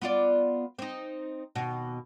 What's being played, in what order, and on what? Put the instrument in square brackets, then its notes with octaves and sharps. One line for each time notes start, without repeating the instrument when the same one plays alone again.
[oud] B3 F4 D5
C4 D#4
D#2 B2